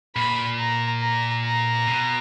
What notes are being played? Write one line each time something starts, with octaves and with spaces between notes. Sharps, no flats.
A#2 B5
A#5
A#5
A#5
B2